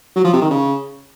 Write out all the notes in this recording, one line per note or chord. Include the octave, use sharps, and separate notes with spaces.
F#3
F3
C3
D#3
C#3